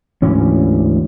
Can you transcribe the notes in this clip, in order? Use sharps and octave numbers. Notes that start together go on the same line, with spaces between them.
D2 G#2 E3 C#4